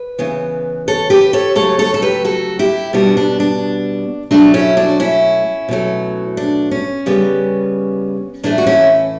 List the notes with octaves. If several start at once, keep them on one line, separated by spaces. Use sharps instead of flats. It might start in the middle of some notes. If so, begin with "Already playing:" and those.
Already playing: B4
C#3 E3 B3
A4 C#5
G4 B4
A4 C#5
C#3 F#3 A3 A4 C#5
A4 C#5
A4
G4 B4
F#4 A4
E4 G4
B2 G3 B3 D4 F#4
D4
D4
B2 F#3 A3 D4
C#4 E4
D4 F#4
C#4 E4
B2 F#3 A3
D4
C#4
C#3 G3 B3
A2 E3 A3 D4
F#4
C#4 E4